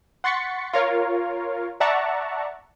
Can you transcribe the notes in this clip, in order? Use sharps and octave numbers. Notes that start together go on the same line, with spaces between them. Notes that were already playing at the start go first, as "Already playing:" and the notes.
F#5 C6 C#6 A6 B6 C#7
F4 A#4 C#5 F5
D5 E5 F#5 A5 A#5 C#6